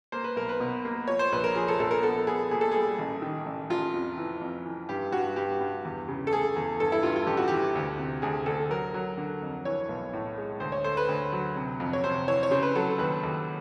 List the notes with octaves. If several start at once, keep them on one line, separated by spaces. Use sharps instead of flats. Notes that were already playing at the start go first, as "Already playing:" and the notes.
A#3 C5
B4
B1 A#4
B4
B2
A#3
F3 C#5
C5
A#1 B4
A#4
F3 G#4
A4
A#1 A4
A#4
B3 A4
B3 G#4
A#2 G#4
A4
G3 G#4
A1
D#3
A1
A1 F4
F2
E3
F2
E3
G2 G4
G2 F#4
G2 G4
G2
E2
C#3
A4
A3 G#4
E2
G2 A4
E4
G2 F4
F4
A1 G4
F#4
E3 G4
D2
C3
D2 G#4
D2 A4
F#3 A#4
F#3
D3
F2
E3 C#5
B1
A2
G#3
D2 C5
C#5
A3 C5
B4
D2
F#3
C3
F2
C#5
C3 C5
E3 C#5
C#5
C#3 C5
B4
F#3 A4
D#2 B4
D#2